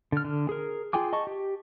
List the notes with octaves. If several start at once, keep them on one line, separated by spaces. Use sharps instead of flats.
D3 F6
D3
G#4 A#4
F4 G#4 G5 G#5 D6
D#5 A5 C#6
G4